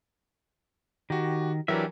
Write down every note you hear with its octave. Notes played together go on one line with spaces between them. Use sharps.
D#3 F#4 G4
E3 F#3 D4 G4 A#4 E5